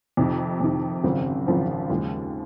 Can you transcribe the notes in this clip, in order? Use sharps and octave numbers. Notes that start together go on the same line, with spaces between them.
F2 C3 D#3
F2 C3 D#3
G#1 F#2 C#3 F3 C4
G#1 F#2 C#3 F3 C4
D#2 C#3 F3 G#3